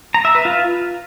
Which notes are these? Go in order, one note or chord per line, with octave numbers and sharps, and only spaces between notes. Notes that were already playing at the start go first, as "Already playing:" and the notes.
A#5
E5
B4
F4